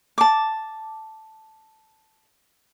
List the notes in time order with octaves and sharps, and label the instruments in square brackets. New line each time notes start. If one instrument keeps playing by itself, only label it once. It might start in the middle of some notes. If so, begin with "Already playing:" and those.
[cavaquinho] A5 D6